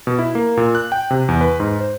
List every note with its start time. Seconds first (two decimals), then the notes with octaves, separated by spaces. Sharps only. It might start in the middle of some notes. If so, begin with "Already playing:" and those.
0.07 B2
0.19 E4
0.35 A#3
0.57 A#2
0.75 F#6
0.92 G5
1.11 C3
1.28 E2
1.41 B4
1.60 G#2
1.80 C5